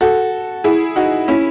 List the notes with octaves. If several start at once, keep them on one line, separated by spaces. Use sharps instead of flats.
F#4 A4
E4 G#4
D#4 F#4
C#4 E4